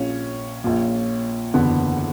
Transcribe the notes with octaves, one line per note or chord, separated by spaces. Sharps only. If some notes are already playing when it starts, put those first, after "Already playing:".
Already playing: A#1 A#2 C#4
A#1 A#2
F#1 E2 D3 B3